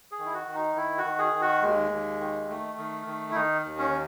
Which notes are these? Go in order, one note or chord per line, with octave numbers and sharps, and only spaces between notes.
G#4
D#3
E4
F#4
D#3
D#4
D#3 E4
F#4
D#3
G#4
D#3
F#4
D#2 G#3
D#2
D#3
D#3 A3
D#3
D#3
E4
D#3 D#4
D#2
C#4